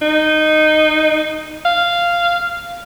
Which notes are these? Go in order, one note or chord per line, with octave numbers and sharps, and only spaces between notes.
D#4
F5